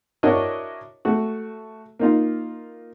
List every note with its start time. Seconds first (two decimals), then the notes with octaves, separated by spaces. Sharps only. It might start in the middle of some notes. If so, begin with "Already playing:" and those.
0.23 D4 E4 F#4 A#4 C#5 D#5
1.05 A3 F#4
1.99 A#3 D#4 F4